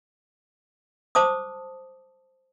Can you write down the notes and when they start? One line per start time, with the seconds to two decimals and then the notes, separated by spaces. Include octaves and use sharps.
1.15 C5 A5 D6 D#6